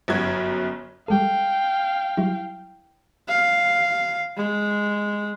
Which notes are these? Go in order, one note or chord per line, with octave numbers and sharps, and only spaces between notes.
G1 F#2 F#3 F#4 G#6
G3 G#3 A4 F5 G5
F#3 G3 E4
F5
G#3